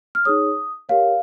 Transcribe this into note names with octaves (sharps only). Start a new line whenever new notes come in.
F6
D#4 G#4 C#5 D#6
G4 A#4 C#5 F5